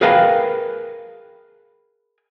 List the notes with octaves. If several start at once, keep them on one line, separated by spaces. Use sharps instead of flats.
G#4 A#4 B4 F5 G5 A#5